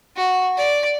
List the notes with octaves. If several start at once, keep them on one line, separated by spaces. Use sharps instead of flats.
F#4
D5